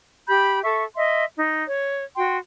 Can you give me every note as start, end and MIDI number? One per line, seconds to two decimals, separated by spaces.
0.28 0.60 67
0.28 0.60 83
0.28 0.60 91
0.63 0.84 69
0.63 0.84 76
0.63 0.84 85
0.96 1.24 75
0.96 1.24 76
0.96 1.24 84
1.34 1.62 63
1.67 2.03 73
2.16 2.36 66
2.16 2.36 79
2.16 2.36 84